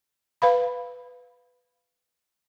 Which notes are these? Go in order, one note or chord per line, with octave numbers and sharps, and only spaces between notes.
B4 F5 B5